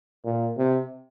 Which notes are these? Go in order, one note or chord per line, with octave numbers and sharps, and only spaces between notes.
A#2
C3